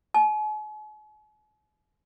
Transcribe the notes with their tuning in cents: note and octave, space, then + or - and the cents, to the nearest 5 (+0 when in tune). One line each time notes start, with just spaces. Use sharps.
G#5 +45